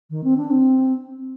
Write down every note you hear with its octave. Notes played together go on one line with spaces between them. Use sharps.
D#3
C4
D4
C4